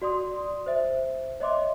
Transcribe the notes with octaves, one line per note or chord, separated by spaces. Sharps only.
F#4 D5 C6 D#6
C5 E5
C#5 D#5 E5 C6 D6